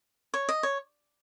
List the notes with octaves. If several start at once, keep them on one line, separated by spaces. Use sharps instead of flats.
C#5
D#5
C#5